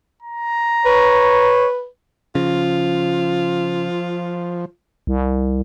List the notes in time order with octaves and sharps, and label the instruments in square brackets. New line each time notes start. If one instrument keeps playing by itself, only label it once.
[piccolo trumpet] A#5
[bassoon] B4 [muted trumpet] C#5
[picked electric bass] C#3 [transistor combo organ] F3 [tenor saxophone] F4
[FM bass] C2